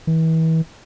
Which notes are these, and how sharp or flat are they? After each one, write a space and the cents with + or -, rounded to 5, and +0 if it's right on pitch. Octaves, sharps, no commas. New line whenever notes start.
E3 -35